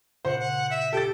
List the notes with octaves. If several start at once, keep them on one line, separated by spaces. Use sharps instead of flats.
A#2 C#3 C5 F#5
F#5
E5 A#6
D#4 G4 A4 E5 G5 A6